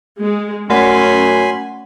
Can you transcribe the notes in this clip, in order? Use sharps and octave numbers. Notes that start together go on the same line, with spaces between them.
G#3
F#2 A3 C#4 F#5 G#5 B5 C6